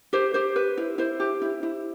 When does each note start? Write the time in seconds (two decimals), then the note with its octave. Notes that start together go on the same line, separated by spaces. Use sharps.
0.13 G4 C5
0.34 G4 C5
0.56 B4
0.77 E4
0.98 E4 C5
1.20 G4
1.42 E4
1.63 E4